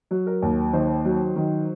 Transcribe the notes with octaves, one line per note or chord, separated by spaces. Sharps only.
F#3
A#4
D#2
D#3 C5
F#3
D#3